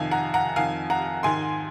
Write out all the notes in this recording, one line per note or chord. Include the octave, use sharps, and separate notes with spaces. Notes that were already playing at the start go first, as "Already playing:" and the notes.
Already playing: F2 C3 D#3 F5 G#5
F#5 A#5
F#5 A#5
F2 D#3 F5 G#5
F#5 A#5
G#2 D#3 G#5 C6